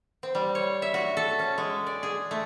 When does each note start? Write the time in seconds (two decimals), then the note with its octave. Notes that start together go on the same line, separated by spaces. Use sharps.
0.23 C4
0.35 G3
0.55 C#5
0.82 E5
0.94 F#4
1.17 A4
1.39 C#4
1.58 G#3
1.87 D5
2.03 G#4
2.31 A3